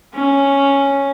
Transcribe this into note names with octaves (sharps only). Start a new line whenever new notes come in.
C#4